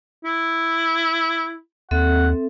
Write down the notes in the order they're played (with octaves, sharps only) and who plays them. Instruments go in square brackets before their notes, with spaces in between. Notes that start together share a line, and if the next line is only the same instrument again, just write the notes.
[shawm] E4
[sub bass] D#2 [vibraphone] C4 A4 E5 [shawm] F#5